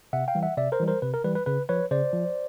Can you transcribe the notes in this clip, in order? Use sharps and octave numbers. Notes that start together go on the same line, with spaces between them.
C3 E5 F#5
F5 G5
E3 G3
E5 F#5
C3 D5 E5
A#4 C5
E3 G3
A#4 C5
C3 B4
A#4
E3 G3 B4
B4
C#3 B4
F3 B4 C#5
C#3 C5 D5
F3